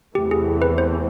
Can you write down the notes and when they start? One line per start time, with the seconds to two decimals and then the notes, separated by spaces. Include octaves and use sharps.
0.15 E2 C3 E3 A3 G4
0.31 G#4
0.62 B4
0.78 C5